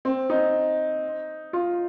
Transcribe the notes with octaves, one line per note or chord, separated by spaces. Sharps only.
C4
D#4
F4